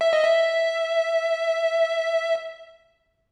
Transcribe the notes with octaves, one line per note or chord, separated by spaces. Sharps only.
E5
D#5
E5